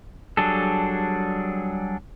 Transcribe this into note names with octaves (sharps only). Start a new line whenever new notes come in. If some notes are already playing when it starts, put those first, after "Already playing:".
F#3 G3 D4 G#4 A4